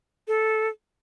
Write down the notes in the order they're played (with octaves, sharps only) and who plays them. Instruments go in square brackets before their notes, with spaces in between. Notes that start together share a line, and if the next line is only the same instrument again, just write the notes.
[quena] A4